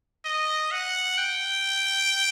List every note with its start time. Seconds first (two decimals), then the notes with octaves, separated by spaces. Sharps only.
0.25 D#5
0.71 F#5
1.18 G5